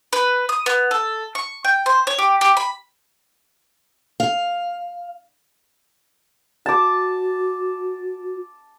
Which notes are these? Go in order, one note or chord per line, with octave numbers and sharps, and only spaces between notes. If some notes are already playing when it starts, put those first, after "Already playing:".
B4
D#6
B3
A4
C#6
G5
C5
C#5
G4
G4
B5
F5
F#4 A5 D6